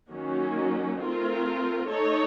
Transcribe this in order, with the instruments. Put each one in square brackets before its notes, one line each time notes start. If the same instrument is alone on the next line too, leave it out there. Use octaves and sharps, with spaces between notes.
[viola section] D#3 F#3 A#3 C#4 F#4
A3 C4 F4 A#4
A3 D#4 A4 C#5